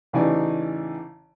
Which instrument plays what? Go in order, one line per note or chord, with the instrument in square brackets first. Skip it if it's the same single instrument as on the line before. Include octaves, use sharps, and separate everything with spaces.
[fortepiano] A1 C#3 E3 D#4 D5 G#5